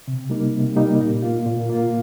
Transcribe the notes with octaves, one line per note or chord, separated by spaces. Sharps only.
C3
G3 A#3 D#4
C3
G3 A#3 D#4
A#2
A#3 F4
A#2
A#3 F4